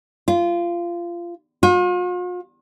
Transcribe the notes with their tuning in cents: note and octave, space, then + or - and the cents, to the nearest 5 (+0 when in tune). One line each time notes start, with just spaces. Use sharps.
F4 -20
F4 +45